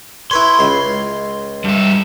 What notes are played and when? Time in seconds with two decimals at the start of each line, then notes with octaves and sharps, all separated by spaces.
0.31 E4 B4 C#5 C6
0.59 C#2 F5
1.65 G2 E5